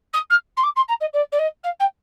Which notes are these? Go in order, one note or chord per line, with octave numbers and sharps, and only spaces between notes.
D#6
F6
C6
D6
C6
A#5
D#5
D5
D5
D#5
F5
G5